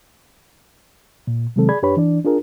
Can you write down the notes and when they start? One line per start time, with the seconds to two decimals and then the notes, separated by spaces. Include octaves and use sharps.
1.27 A#2
1.56 C3 D#3 F#3 G#3 C4 A4
1.69 G#4 D5 B5 G#6
1.82 F#2 D4 G4 B4 C#5 B5
1.97 E3 D4 D5
2.25 D4 F4 G#4 A#4